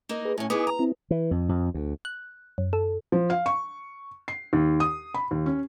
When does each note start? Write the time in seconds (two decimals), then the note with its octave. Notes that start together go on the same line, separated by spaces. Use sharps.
0.09 A#3 D#4 A#4
0.25 G#4 B4
0.38 A2 C#4 G#5
0.50 B3 D#4 G#4 G#5 D6 D#6
0.67 A#5
0.79 C4 E4
1.11 E3
1.31 F2
1.49 F2
1.74 D2
2.05 F#6
2.58 F#2
2.73 A4
3.12 F3
3.30 F5
3.46 C#6
4.28 C7
4.53 D#2
4.80 D#6
5.14 B5
5.31 D#2
5.46 C#4